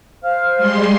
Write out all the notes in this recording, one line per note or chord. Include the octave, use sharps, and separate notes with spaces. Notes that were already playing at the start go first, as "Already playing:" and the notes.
C5 F5 F6
G3 G#3 C6